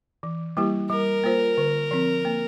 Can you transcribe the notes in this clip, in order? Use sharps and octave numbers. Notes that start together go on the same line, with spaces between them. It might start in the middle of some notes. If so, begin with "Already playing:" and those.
E3
G3 A#3 E4 G4
G3 A#4
A#3 F4 C5
D3
F3 C4
A#3